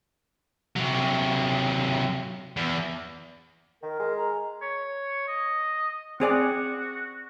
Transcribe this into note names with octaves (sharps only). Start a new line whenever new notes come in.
C3 F#3
E2
D#3 A#4
G#3
A#5
C#5
D#5
C4 F#4 G#4 D5